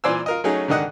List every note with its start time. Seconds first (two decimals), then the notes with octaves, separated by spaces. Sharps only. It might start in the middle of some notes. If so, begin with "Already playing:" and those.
0.04 A#2 E3 C5 D5 G#5 E6
0.26 F4 A#4 D#5
0.44 F#3 A3 C#4 D#4 G#4
0.68 G#2 D3 D#3 D4 D#5 F#5